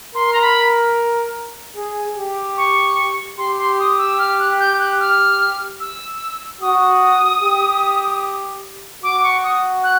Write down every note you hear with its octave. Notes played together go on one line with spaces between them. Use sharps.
A#4 C6
A#5
B5
G#4
G4
C#6
G4 C6
C6
D#6
E6
F6
F#6
G6
F#6
F6
E6
F#4 D#6
G4
F#4 D6
C#6
D#6
F#6